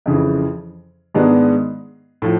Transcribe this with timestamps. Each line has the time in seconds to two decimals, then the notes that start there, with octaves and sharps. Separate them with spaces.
0.06 F2 C#3 E3
1.14 G#2 D#3 G#3 B3 D4
2.22 A2 F3